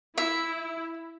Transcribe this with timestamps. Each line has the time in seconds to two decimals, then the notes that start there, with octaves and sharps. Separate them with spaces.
0.18 E4 E5